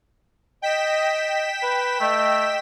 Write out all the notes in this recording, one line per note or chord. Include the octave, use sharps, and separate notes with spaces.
D#5 G5 B6 E7
B4
A3 D#5